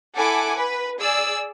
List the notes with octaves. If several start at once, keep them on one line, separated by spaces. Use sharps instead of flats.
E4 A4 F#5 G#5 D6
B4
G#4 D5 E6